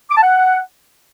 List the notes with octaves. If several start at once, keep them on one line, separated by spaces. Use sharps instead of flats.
D6
A5
F#5